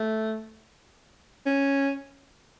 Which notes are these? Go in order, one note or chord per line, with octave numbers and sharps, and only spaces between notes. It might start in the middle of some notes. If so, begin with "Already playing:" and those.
Already playing: A3
C#4